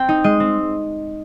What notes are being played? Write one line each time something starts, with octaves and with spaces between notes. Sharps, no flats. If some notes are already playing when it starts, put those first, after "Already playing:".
Already playing: C4 G5
D#4
G#3 D#5
C4